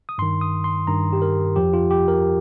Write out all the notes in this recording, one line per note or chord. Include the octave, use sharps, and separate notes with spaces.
D#6
G2 D#3 C6
D#6
C6
G2 D#3 A#5
G4
A#4
F2 F3 G4
F4
G4
A#4